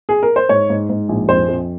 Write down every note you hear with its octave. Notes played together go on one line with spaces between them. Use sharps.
G#4
A#4
C5
G#2 C#5
G#2
G#2
A#1
F2 C5
F2